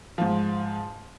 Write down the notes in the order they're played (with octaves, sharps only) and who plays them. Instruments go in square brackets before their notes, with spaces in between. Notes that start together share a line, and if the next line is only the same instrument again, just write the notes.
[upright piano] G#2 F3